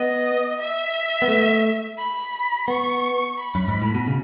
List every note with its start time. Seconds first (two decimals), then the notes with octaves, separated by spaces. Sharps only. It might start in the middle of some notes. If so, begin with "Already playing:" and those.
Already playing: B3 D#5
0.59 E5
1.22 B3
1.28 A3
1.98 B5
2.68 B3 C#6
3.38 B5
3.55 F#2
3.68 G#2
3.82 A2
3.95 B2
4.07 C#3